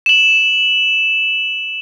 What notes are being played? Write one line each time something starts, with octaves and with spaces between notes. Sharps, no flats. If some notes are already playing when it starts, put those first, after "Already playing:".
E7 F#7